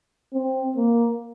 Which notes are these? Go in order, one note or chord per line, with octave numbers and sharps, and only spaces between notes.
C4
A#3